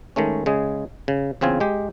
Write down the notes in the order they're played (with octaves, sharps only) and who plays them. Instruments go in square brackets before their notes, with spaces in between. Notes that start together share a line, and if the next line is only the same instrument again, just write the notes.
[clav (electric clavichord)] D#3 G#3 A3 C#4
C#3 G#3 G#4
C#3
E2 C#3 C4 F4 G#5
G#3 G4